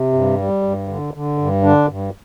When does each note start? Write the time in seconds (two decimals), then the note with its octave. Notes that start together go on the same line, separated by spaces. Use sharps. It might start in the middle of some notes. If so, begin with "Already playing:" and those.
Already playing: C3
0.13 G2
0.38 G3
0.63 G2
0.88 D3
1.14 D3
1.38 G2
1.63 D3 D4
1.88 G2